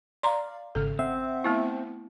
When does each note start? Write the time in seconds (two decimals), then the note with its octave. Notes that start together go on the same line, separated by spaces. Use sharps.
0.23 D5 F5 A#5 C6
0.75 G#1 C#3 A4 F6
0.99 C4 E5 F#5
1.44 A3 B3 E4